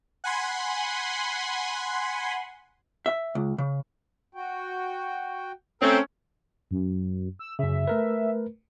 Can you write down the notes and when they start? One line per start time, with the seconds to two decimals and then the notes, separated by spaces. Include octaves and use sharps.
0.24 F#5 G#5 B5 C6
3.06 E5
3.35 C#2
3.58 C#3
4.34 F#4 G5
5.82 A3 C4 C#4 A#4
6.71 F#2
7.39 E6
7.59 F#2 C#3 E5
7.87 A3 A#4 B4